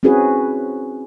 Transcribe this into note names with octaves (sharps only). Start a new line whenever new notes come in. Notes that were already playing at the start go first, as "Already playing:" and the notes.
C4 C#4 E4 F#4 G#4 B4